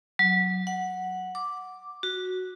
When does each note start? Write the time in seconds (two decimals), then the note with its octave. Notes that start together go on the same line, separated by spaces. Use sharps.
0.19 F#3
0.67 F#5
1.35 D6
2.03 F#4